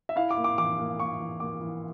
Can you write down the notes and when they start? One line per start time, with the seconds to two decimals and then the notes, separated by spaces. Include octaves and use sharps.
0.09 E5
0.16 E4 F5
0.31 D6
0.37 A#3
0.44 D6
0.58 E3 D6
0.79 A#3
0.99 A#3 C#6
1.20 E3
1.40 A#3 D6
1.61 E3